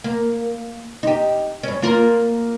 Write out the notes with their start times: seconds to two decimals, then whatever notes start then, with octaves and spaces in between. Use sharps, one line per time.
0.04 A#3
1.03 D#4 G4
1.63 G2 C#4
1.82 A#3 F4 A#4